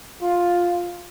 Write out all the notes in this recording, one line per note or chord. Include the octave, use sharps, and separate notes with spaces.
F4